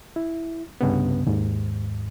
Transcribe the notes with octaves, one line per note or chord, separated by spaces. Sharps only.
E4
C2 G2 C#3 B3
D#2 G#2